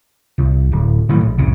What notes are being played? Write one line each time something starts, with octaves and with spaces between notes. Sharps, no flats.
C2
D1
A2 D#3 E3 F#3
A#1
C2 F2 A2 C#3